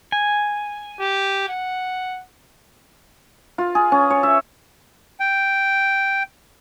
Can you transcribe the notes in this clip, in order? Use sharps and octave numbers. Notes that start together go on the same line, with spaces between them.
G#5
G4
F#5
F4
G#4
C#4
C#5
E5
G5